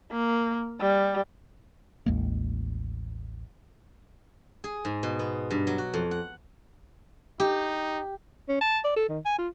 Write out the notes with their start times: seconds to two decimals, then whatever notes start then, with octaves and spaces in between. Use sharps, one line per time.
0.12 A#3
0.80 G3
2.06 A1 D#2 G#3 A#3
4.64 G#4
4.85 G#2
5.03 B2
5.19 B3
5.51 G2
5.67 F#3
5.78 F#4
5.94 F2
6.11 F#5
7.40 D#4 G4
8.49 C#4
8.61 A5
8.84 D5
8.97 A4
9.09 D#3
9.25 G#5
9.39 F4